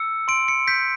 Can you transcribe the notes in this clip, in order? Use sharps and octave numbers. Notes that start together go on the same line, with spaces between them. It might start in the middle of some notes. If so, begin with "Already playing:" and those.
Already playing: E6 C#7
C6 D7
C#7
G6 B6